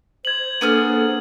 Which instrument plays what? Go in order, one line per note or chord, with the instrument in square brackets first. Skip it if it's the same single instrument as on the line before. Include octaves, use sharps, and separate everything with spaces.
[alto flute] C5 [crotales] G#6 F#7
[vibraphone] A#3 D4 A4 [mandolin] B3 G#4 F6 [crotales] D#7